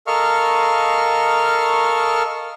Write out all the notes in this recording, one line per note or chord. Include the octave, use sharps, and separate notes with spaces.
A4 A#4 D#5 F5 C#6 F6